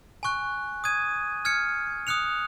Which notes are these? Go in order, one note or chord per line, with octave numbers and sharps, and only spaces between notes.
G#5 C#6 F#6
D#6 G#6 D#7
F6 G#6 C#7
D#6 F#6 C#7 F7